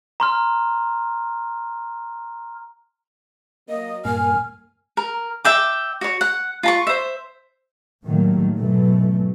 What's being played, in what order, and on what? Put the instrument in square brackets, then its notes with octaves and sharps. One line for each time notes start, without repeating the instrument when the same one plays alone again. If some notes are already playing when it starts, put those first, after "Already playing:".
[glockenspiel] A#5 C6 F6
[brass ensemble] F#3 A#3 [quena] D#5
[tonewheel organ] G2 A#2 A#3 [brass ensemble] G#5 [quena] F6
[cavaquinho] A#4
E5 G5 D6
F#4 C#5
F#5
F4 A5 C#6
C5 E5
[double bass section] A2 D#3 F#3 G3 A3 A#3
G#2 B2 E3 F#3 A3